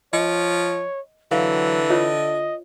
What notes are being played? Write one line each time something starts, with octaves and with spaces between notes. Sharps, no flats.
F3 C#5 D#5
D3 E3 F#3 F5
F4 C#5 D#5 E5